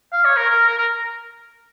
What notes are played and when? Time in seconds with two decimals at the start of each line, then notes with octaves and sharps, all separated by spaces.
0.12 F5
0.25 C#5
0.37 A#4
0.50 A#4
0.68 A#4
0.78 A#4